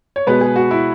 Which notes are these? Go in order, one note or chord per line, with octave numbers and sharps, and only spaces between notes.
C#5
B2 G#3 B3 B4
G#4
F#4
E4